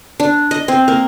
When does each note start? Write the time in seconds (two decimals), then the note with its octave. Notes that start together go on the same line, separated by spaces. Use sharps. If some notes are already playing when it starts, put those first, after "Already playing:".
0.20 D4
0.51 D#5
0.68 C4
0.88 A#3